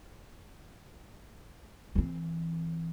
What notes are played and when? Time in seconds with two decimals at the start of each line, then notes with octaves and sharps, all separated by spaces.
1.95 E3 C4